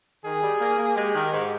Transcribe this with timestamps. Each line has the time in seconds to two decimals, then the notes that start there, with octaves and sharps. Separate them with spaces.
0.25 D#3 G#4
0.42 G3
0.60 A#3
0.78 A#3
0.95 G#3 G4
1.14 D#3
1.32 G#2